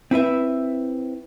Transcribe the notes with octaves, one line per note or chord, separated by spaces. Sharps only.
C4 E4 B4 E5